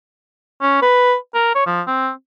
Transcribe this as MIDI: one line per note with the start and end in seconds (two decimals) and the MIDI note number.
0.62 0.79 61
0.82 1.14 71
1.34 1.51 70
1.55 1.65 73
1.67 1.81 53
1.87 2.10 60